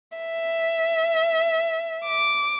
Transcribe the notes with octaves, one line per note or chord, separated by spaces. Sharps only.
E5
D6